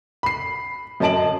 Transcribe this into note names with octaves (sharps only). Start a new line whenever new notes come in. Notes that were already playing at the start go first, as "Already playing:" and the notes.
B5 C7
F#2 C#4 D#5 A5 D7 F#7